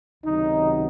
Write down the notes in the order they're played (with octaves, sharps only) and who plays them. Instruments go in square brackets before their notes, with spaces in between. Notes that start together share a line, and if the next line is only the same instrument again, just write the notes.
[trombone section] C#2 C3 D#3 F#3 D#4